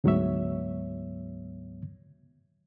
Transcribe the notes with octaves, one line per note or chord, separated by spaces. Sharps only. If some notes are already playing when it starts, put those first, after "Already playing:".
D2 G#2 F#3 B3 C#5 E5